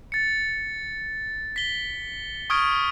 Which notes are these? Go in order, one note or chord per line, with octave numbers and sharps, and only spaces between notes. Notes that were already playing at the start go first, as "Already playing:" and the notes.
A6 C#7
B6 G7
C#6 D#6 F6 G#6 D7